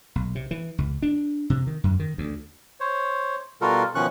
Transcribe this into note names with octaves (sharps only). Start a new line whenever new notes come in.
B1
C3
E3
C#2
D4
C3
D#3
F#2
D#3
D2
C5 C#5
B2 G3 F4 F#4 A4 A#4
B2 D#3 F3 C#4 C#6 F#6